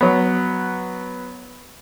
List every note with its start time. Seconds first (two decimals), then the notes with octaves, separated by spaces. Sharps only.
0.01 F#3 B3